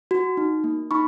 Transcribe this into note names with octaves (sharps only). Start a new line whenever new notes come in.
F#4
D#4
A#3
D#4 B5 C#6